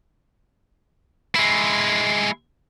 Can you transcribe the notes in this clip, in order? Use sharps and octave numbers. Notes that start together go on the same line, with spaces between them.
G#3 E4